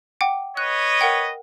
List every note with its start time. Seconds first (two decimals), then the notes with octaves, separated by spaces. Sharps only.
0.21 F#5 G5 D6
0.57 B4 C#5 D#5 F#6
1.01 A#4 F#5 G5